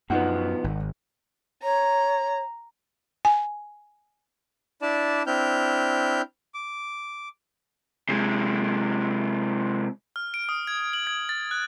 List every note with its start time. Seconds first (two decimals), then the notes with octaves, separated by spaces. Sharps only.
0.10 F#2 B2 F3 B3 D#4 F#5
0.64 G#1
1.63 C#5 A#5
3.25 G#5
4.82 D4 E4 D5 A5
5.27 C4 D4 E4 F6 G6
6.54 D6
8.09 C3 G#3
10.16 F6
10.34 D7
10.49 D#6
10.67 G#6
10.93 F#7
11.07 G#6
11.29 A6
11.51 F#6